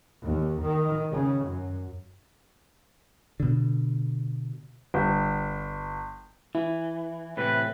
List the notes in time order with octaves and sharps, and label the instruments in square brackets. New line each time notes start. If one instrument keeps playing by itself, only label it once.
[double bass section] D#2
D#3
C#3
F#2
[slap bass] B2 D3
[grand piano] G1
[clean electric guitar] E3 [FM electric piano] E4
[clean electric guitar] A2 C3 E3 [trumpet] B4